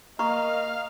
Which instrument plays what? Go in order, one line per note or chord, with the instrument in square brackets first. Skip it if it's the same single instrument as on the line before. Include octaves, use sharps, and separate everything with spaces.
[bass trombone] A#3 [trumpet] D#5 [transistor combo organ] F5 [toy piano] A#5 C#6